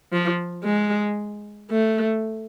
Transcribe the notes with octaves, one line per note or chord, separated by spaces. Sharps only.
F3
G#3
A3